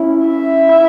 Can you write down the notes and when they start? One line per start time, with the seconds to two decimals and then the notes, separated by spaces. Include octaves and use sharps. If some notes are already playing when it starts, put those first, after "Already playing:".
Already playing: C#4 E4
0.27 E5
0.69 E4